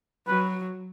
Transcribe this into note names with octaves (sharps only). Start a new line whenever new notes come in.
F#3 B4